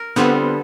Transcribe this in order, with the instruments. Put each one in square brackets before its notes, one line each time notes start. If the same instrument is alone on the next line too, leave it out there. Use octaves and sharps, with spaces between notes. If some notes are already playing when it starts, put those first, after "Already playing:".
Already playing: [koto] A#4
[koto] D3 G3 C4 F4 A4 [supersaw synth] B3